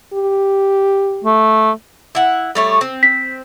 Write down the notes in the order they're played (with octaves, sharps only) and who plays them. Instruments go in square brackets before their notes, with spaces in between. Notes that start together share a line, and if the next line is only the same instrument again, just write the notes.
[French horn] G4
[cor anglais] A3
[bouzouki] E4 F#5
G3 A3 C#5
C4
[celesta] B6